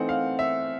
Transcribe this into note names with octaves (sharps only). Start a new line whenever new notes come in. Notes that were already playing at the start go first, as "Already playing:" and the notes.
Already playing: E3 A3 C4 D#4 F#5
F5
E5